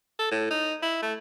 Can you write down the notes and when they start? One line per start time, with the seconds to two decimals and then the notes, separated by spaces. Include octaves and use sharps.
0.19 A4
0.31 A2
0.50 D#4
0.82 E4
1.02 A3